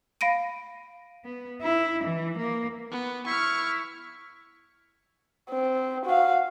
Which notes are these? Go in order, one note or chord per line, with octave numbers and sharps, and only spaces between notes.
F5 B5 A#6 D7 D#7
B3
E4
E3
A#3
B3
E4 C#6 F6
C4
F#4 F5